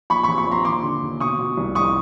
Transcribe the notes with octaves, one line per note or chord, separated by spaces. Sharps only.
A#1 B5 C#6
A#1 B5 C#6
B5 C#6
A#1 A#5 C6
D#2 C6 D6
D3
D#2
B2 C#6 D#6
B2
C2
F1 C#6 D#6